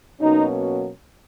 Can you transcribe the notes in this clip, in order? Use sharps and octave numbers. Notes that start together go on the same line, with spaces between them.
B2 F#3 A#3 C#4 D#4